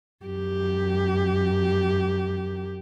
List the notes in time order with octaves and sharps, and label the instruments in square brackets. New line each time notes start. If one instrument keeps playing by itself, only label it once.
[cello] F#2 G4